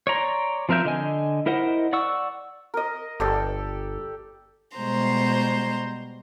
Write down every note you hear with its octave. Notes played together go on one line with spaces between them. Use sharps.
C#5 D5 A#5 C6
F3 C4 A#4 E5 G6
D3 D#5 G#5
E4 A#4 C5 D#5 F#5
D5 F#5 C#6 E6
A#4 D#5
G1 G4 A4 D5
B2 G3 G#3 C5 A#5 C6